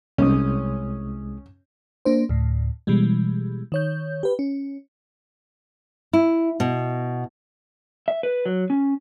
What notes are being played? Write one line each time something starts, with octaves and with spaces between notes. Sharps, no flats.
C2 G#3 C#4 D#6
A#3 D4 C5
D2 A2
B2 E3 G3 G#3
D#3 C#5 G6
G4 B4
C#4
E4
B2
E5
B4
F#3
C#4